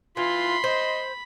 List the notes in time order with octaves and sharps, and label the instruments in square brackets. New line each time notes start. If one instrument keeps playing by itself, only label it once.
[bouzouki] E3 [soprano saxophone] F4 [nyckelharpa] B5 [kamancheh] C6
[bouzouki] C5 [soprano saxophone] D#5